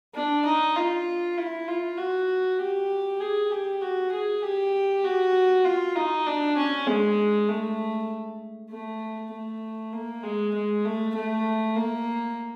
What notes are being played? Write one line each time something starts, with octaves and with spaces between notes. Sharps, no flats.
D4
D#4
F4
E4
F4
F#4
G4
G#4
G4
F#4
G#4
G4
F#4
F4
D#4
D4
C#4
G#3
A3
A3
A3
A#3
G#3
G#3
A3
A3
A#3